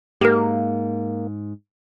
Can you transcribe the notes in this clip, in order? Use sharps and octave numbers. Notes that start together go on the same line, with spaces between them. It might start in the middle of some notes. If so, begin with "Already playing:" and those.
G#2 A#3 G4 A#4